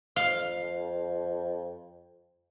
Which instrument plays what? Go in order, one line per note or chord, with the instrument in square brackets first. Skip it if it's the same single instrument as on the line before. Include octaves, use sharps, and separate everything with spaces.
[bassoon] F2 [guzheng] F5